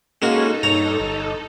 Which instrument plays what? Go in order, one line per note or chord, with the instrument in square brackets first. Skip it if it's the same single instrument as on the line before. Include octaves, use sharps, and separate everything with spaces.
[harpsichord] G#3 A#3 F#4 [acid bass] C#4 [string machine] D#4 A4
[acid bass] G2 [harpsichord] C#5 A#5
[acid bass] G1